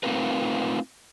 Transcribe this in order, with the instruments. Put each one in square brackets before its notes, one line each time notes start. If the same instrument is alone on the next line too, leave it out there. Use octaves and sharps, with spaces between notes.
[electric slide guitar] A3 C4 D#4 F4 A#4 B4